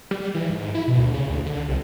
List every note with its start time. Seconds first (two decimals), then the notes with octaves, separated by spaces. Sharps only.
0.11 G3
0.34 E3
0.50 G#2
0.75 E4
0.88 B2
0.99 D2
1.14 C#3
1.29 D2
1.46 D3
1.68 C2